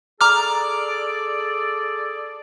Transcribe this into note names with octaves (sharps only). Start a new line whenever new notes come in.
G#4 A4 D5 A#5 D6 F6